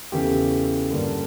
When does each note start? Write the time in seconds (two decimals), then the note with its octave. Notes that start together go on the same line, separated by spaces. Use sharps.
0.12 E2 C#3 E3 A3 C#4 G4
0.90 G2 D3 G3 A#3 C#4